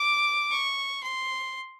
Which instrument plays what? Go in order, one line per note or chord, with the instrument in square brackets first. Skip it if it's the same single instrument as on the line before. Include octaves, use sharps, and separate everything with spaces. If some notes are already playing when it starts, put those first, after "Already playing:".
Already playing: [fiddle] D6
C#6
C6